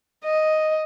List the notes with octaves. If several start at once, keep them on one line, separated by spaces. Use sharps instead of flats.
D#5